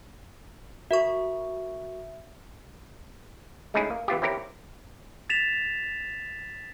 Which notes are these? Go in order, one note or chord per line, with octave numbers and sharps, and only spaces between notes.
F#4 A#4 E5 C#6
G#3 A3 C#4 D#4 E4 G#4
A#3
E3 B3 F4 G4
C4 E4 G4 A#4 C#5
A6 B6 E7 F7